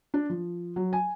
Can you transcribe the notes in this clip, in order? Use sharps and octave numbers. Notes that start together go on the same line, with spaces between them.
D4
F3
F#3
G#5